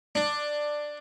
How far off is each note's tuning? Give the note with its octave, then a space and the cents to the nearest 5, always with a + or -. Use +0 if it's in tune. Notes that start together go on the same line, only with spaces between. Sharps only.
D4 +10